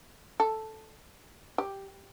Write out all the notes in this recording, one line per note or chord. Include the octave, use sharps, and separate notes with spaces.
A4
G4